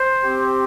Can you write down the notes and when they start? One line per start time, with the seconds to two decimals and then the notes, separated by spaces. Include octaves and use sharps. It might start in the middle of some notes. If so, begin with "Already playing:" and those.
Already playing: C5
0.24 C4 G4